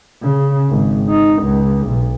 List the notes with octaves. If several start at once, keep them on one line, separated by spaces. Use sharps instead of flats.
C#3
G#1
D#4
C#2
B1